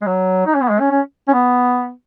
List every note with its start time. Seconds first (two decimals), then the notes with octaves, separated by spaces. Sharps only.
0.02 G#3
0.06 F#3
0.46 D#4
0.55 C#4
0.62 B3
0.70 G#3
0.80 C#4
0.91 C#4
1.28 C#4
1.33 B3